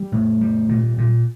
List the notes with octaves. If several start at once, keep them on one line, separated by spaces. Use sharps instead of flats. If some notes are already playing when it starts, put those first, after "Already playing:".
Already playing: G3
A2
G3
A#2
A#2